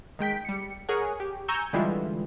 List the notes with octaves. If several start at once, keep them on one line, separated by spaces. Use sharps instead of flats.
D#3 G#3 G5 B6
G3 C#7
G#4 A#4 C#5 F#5 G#5
G4
G#5 A#5 C#6 E6 G6
D3 E3 G3 G#3 E4 F4